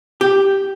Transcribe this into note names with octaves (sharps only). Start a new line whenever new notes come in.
G4